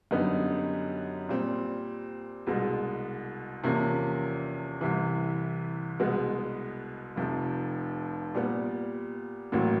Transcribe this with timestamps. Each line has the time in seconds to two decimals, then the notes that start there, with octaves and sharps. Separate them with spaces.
0.11 F#2 D3 G3 B3 D#4
1.29 A#2 G3 C4
2.47 C2 B2 G#3
3.64 E2 C3 F3 A#3 C#4
4.81 C2 C3 E3
6.00 C2 B2 G#3 B3
7.16 F1 F2 C3
8.35 A#2 G3 B3
9.52 A1 A2 F#3 A#3